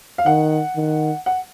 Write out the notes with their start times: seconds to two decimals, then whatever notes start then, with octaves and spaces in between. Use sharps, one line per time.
0.18 F5
0.26 D#3 F#5
0.76 D#3
1.26 F#5